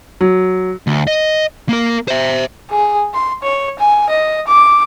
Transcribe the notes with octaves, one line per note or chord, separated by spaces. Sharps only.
F#3
D2
D#5
A#3 A#4
C5 E5
G#4
C6
C#5
G#5
D#5
D6